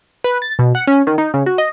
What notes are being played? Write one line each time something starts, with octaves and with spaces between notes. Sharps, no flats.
B4
A6
B2
F#5
C#4
D#3
D#4
C#3
F#4
D#5